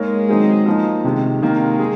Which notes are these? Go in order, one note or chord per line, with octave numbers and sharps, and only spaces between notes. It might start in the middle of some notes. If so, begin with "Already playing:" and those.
Already playing: G#3 A#3 D#4 A#4 C#5
D#3 F#3 C4 D#4 G#4
F3 A#3 D#4
C3 D#3 G#3
C3 D#3 G#3 A#3
G#4